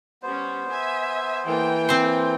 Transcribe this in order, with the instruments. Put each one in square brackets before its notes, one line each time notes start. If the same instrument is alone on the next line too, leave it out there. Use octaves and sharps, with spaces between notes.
[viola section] G3 C#4 [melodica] B3 C5
[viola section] E5 G#5
[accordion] E3 [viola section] A#3 A4 G5
[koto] C4 C5